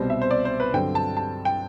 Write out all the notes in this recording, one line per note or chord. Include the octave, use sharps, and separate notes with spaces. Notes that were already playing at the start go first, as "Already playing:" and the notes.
Already playing: C2 B2 G3 C4 C5
E5
C5
D5
C5
B4
G2 D3 F#3 C4 G5
A5
A5
G5